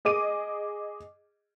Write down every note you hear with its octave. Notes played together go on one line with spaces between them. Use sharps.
G#4 D#5 D6 D#7